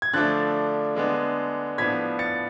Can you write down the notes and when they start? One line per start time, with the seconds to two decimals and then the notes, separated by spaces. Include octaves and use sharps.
0.02 G#6
0.13 D3 F3 A3 D4 F#6 A6
0.95 D3 G#3 B3 D4
1.78 A2 F3 B3 D4 G#6 B6
2.19 A6 C#7